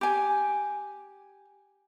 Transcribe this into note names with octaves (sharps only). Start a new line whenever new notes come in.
G4 G#5